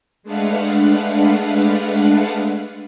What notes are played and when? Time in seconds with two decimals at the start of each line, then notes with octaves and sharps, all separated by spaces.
0.23 G#3 A3 D4 B4 F5 F#5